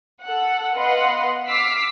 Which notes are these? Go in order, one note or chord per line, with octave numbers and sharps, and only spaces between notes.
A4 F#5
B3 B4 D#5 F5 F#5 C6
D6 E6 F6 B6 C7